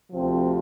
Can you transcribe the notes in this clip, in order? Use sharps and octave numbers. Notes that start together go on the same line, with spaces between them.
D2 C3 F3 C4